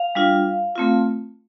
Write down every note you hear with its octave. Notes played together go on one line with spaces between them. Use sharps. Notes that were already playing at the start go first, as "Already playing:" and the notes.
Already playing: F5
G3 D4 F4
A3 C4 F4